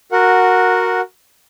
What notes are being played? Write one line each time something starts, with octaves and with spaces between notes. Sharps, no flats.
F#4 A#4 F#5